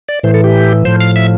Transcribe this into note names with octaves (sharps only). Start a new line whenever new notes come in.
D5
A2 E3 C5
A4
G4
A2 F3 C5
F5
E5